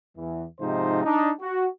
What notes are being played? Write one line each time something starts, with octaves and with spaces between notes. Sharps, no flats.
E2 E3
G#2 C3 F3 D#4 C5
D4 D#4
F#4